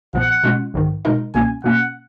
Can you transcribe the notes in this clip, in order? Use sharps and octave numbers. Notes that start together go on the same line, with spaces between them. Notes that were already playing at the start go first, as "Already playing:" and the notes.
A#1 A#2 F3 B3 F#5
B2 G#3 C#4 F4
A#1 G#2 D#3
B2 G#3 D#4 A#4 D#5
C#2 B2 A#3 C#4 G#5
B2 A#3 C#4 F#5